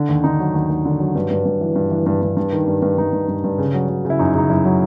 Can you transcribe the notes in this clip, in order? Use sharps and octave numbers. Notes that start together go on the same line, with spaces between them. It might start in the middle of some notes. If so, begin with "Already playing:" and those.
Already playing: D3
D#2
D3 D#4
F#3
D#2
D#2
D3
F#3
G2
G2
G2
E3
G2
E3
G2
G2
G2
D#3
G2
G2
G2 D#4
G2
G2
G2
C#3
F#3
F#3
C#3
E4
F#2 D#4
C#3 D#4
F#2 E4
F#3